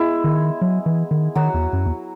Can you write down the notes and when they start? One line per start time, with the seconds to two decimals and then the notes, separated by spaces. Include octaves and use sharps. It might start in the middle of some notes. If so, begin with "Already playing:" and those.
Already playing: G#3 B3 E4 G#4
0.24 D#3
0.61 F#3
0.86 E3
1.11 D#3
1.35 D#3 F#3 F#4
1.54 E2
1.73 F#2
1.86 E2